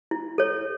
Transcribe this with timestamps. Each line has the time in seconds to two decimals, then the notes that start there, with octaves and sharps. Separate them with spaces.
0.11 E4
0.38 A4 C#5